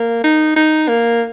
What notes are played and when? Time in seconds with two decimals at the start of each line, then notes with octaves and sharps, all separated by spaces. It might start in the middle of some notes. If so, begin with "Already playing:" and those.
Already playing: A#3
0.24 D#4
0.56 D#4
0.88 A#3